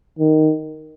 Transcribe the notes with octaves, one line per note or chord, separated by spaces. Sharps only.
D#3